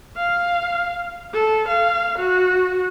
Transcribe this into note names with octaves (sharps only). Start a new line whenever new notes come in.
F5
A4
F5
F#4